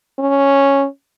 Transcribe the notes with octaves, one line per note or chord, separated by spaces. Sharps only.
C#4